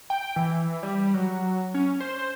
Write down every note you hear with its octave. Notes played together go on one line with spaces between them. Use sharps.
G5
E3
G3
F#3
C#4
C5